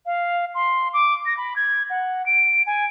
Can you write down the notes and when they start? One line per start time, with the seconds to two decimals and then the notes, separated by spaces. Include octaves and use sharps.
0.06 F5
0.54 C6
0.93 D6
1.26 A#6
1.37 B5
1.56 G#6
1.90 F#5
2.26 D7
2.66 G#5